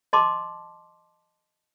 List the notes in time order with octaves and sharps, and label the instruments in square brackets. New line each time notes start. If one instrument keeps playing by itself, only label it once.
[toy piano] D#5 A5 C6 D6